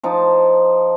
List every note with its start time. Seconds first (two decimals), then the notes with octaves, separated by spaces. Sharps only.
0.03 F3 D#4 A5